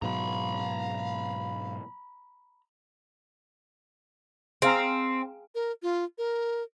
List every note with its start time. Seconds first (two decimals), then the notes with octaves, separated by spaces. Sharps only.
0.02 G#2 B2 F#3 F5 A#5 B5
4.62 C4 G#4 F5 A#5
5.55 A#4
5.83 F4
6.18 A#4